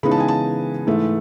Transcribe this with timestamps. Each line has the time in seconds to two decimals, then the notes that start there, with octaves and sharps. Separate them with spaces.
0.03 C#3 E3 G#3 B3 D#4 B5
0.11 A5
0.20 G#5
0.28 A5
0.87 G#2 E3 A3